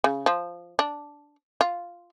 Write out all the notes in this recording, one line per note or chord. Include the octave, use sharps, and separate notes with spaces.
C#3
F3
D4
F4